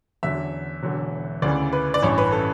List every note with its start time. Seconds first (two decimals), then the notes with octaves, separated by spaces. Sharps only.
0.23 E2 D3 F#3 E5
0.83 E1 E2 D3 F#3
1.42 D2 C#3 E3 D5
1.73 B4
1.94 D5
2.02 A1 G2 E3 C#5
2.18 B4
2.32 A4